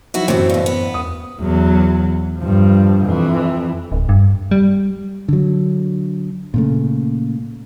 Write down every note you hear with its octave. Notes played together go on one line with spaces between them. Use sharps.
F3 F#3 D#4 E4 F#4
F#2 A2 C3 E3 F#3 C5
G2 B2
B3
E2 D#6
E2 F#3
G2 F3
F2 E3
D1
G2
G3
D3 F#3
A#2 C#3 A3